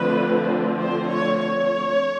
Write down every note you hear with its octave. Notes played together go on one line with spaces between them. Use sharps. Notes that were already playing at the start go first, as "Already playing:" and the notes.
Already playing: D3 F3 A3 C4 B4
C5
C#5
C#5